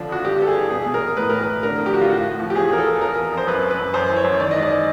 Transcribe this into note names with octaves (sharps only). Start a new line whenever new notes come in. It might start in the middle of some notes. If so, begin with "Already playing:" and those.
Already playing: D3 F3 D4
F2 F#4
G2 G4
G2 A4
G#4
E3
B2 G#4
B2
A#4
B2
A2 B4
E3 A#4
A2 B4
D3 A#4
F2
G4
F2 F#4
F4
A2 F#4
A2
F3
G4
E2 G#4
E2 A#4
A4
E3
F2 A#4
F2
F2 C5
F#2 B4
F#2
B4
F#2
F#2 C5
E3
C#5
F#2
D#3 D5
G#2 D#5
D5